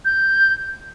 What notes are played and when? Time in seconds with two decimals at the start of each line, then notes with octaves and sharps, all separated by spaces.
0.05 G6